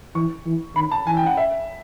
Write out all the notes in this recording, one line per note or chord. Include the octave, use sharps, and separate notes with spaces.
E3 C#6
E3
D#3 B5
A5
E3 G#5
G5
F#5
E5